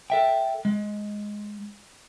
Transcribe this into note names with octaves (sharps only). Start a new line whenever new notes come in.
A4 E5 G5
G#3